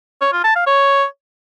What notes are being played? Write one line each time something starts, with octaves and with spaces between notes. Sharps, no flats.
C#5
F4
A5
F5
C#5